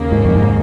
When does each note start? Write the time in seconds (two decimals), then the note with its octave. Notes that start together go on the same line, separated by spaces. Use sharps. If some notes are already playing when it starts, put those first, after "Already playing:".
Already playing: D#2 C#3 A#3
0.12 G#2
0.25 F2
0.35 G#2